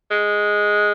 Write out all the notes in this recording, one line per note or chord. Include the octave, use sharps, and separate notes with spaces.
G#3